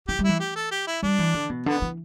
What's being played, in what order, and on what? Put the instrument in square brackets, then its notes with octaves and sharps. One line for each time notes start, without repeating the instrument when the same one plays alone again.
[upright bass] E3 [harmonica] G4
[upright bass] G3
[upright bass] E3 [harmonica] E4
[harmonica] G4
A4
G4
E4
[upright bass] G3 [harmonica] D4
[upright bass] E3
D3
B2
[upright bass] D3 [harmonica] B3
[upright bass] E3